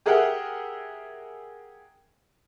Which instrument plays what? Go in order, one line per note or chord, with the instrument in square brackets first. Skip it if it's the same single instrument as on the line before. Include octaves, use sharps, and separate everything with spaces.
[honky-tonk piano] G4 G#4 A#4 E5 F#5 G5